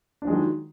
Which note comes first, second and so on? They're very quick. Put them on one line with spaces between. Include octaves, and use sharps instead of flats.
D4 F3 G#3 F#3 D#3